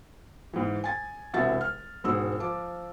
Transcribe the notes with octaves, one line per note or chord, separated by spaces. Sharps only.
G#2 E3
G#5 A6
E1 C2 F#4 E5 F#5 A6
F6
E1 G#2 F#4 G#4 E6
F3 D6